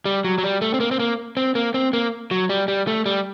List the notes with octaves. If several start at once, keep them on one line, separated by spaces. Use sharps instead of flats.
G3
F#3
F#3
G3
A3
C4
A#3
C4
A#3
C4
A#3
C4
A#3
F#3
G3
G3
A3
G3